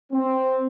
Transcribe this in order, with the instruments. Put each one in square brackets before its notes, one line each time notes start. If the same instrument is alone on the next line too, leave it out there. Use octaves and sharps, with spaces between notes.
[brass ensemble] C4